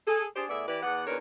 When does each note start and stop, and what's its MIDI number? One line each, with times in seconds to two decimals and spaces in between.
0.07 0.25 68
0.07 0.25 69
0.35 0.44 62
0.35 0.44 67
0.35 0.44 68
0.35 0.44 72
0.49 0.64 45
0.49 0.64 59
0.49 0.64 68
0.49 0.64 74
0.49 0.64 76
0.67 0.82 52
0.67 0.82 64
0.67 0.82 67
0.67 0.82 71
0.67 0.82 74
0.83 1.03 40
0.83 1.03 59
0.83 1.03 74
0.83 1.03 78
1.06 1.17 40
1.06 1.17 62
1.06 1.17 63
1.06 1.17 70
1.06 1.17 71
1.06 1.17 73